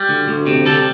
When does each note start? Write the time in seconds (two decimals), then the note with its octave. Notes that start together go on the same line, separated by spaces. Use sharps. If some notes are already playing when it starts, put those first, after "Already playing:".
Already playing: G3
0.09 D2
0.28 D2
0.47 C3
0.65 G3 A4